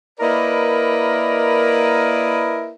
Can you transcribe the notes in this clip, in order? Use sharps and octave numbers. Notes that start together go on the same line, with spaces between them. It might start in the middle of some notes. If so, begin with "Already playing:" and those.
A#3 E4 A#4 B4 D5 D#5